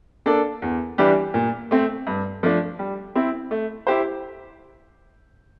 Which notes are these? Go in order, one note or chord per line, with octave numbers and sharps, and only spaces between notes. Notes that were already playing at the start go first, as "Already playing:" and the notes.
A#3 D4 A4 D5
E2
E3 G3 D4 G4
A#2
A3 C4
G2
F3 A3 D4
G3
C4 E4
A3
E4 G4 C5